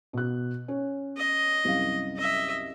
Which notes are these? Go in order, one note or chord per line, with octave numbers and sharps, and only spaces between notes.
B2 F#6
C#4
D#5
C2 F#2 F5
D#5 E5